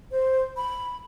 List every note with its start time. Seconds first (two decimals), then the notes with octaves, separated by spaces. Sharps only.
0.11 C5
0.57 B5